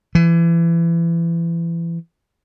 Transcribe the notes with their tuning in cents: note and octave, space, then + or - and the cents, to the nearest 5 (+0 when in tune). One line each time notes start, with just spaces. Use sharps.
E3 +30